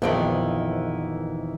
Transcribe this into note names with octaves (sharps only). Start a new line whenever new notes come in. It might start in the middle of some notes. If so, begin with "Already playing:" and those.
A#1 F2 D#3 E3 B3 G5